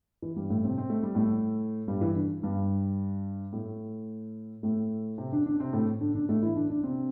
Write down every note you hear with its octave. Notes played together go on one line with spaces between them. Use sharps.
E3
G2 G3
A2 A3
C3 C4
C4
A3
G3
A2 A3
G2 G3
E3
D3
G2 G3
A2 A3
A2 A3
C3 C4
D3 D4
D3 D4
C3 C4
A2 A3
D3 D4
D3 D4
A2 A3
E3 E4
D3 D4
D3 D4
C3 C4